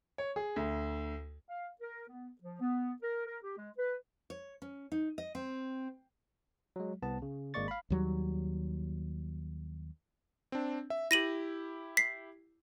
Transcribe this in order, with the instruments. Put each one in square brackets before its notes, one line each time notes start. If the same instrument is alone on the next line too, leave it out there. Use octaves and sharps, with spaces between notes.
[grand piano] C#5
G#4
D2
[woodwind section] F5
A#4
B3
F3
B3
A#4
A#4
G4
G#3
B4
[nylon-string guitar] C#5
C#4
D#4
D#5
C4
[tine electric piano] F#3 G#3
C2 B3 A5
C#3
G#1 G#3 A#3 D5 C#6 A6
F5 B5
[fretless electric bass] D#2 F#3 G3
[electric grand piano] C4 D4
E5
[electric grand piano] E4 G4 [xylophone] A#6 D#7 F#7
[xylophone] B6 C7